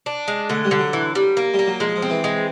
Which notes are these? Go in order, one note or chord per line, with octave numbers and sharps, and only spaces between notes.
D4
G#3
D3 A3
G3
D3
F#3
E3
G3
A#3
G3
A#3
F#3
F3 G#3
F3
C4
E3
G#3